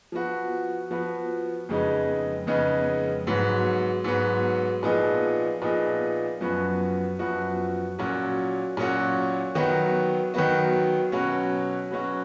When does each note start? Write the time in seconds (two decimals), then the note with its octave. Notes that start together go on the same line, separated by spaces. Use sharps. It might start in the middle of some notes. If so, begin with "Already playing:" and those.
0.12 F3 B3 F#4
0.91 F3 B3 F#4
1.69 F2 C#3 G#3 B3 D#4
2.47 F2 C#3 G#3 B3 D#4
3.27 G#2 F#3 B3
4.04 G#2 F#3 B3
4.83 A#2 F3 B3 D#4 G#4
5.62 A#2 F3 B3 D#4 G#4
6.41 F#2 F3 B3 F#4
7.19 F#2 F3 B3 F#4
7.99 A#2 F#3 C#4 F#4
8.77 A#2 F#3 C#4 F#4
9.55 D#3 F#3 B3 F#4
10.34 D#3 F#3 B3 F#4
11.12 B2 F#3 C#4 F#4
11.91 B2 F#3 C#4 F#4